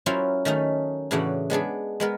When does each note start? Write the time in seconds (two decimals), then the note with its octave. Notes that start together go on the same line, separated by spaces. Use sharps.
0.06 F#3 C#4 E4 F4 A#4 C5
0.45 D#3 A3 C#4 D#4
1.11 A2 C#3 E3 D4 F#4 F#5
1.50 G#3 B3 D4 G#4
2.00 G#3 B3 A#4